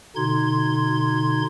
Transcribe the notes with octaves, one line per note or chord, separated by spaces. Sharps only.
B2 D3 D#4 C6 G#6